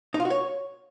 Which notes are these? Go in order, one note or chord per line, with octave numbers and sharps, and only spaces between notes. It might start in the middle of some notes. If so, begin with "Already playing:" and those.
D#4
F4
F#4
C#5